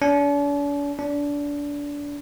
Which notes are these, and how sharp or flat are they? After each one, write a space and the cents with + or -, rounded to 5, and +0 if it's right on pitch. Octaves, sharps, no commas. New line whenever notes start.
D4 -45
D4 -25